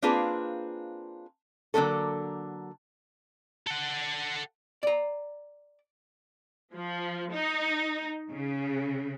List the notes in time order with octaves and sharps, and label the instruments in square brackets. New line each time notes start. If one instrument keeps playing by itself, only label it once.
[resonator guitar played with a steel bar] A#3 C4 D4 F4 G#4 B4
D3 F#3 A#3 C#4 A4
[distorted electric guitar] A4 F#5
[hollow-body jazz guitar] D5 A#5
[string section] F3
D#4
C#3